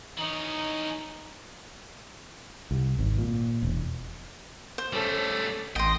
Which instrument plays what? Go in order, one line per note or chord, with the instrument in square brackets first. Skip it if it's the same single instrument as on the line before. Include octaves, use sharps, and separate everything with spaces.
[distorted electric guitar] E3 C#4 [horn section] D#4
[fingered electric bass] C2
G#1
A#2
E1
[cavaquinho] C5
[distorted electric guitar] G3 A3 [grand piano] C#4 A4
[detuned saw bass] A1 [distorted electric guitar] D#5 [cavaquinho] G5 C6